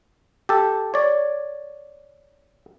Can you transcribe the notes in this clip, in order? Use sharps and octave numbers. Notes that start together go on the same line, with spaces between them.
G4 A4
C#5 D5